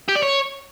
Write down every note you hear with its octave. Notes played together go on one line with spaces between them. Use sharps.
G4
D5
C#5